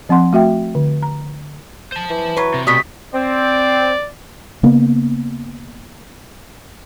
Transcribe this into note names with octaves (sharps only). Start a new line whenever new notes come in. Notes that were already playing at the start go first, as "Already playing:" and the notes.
F3 C4 F#5 C6
A3 F#4 E5 G5
D3
A#5
C5 A5
E3
F#3 B4
C3
B2 G3 A3 D#6 B6
C4 D5
C#3 A#3 B3